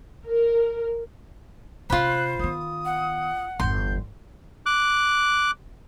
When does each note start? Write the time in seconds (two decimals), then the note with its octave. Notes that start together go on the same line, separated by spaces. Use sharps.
0.25 A#4
1.90 C3 C#4 F4 C5 B5 F#6
2.39 D#3 B3 D#6
2.85 F#5
3.60 G1 E2 C6 G6
4.66 D6 F#6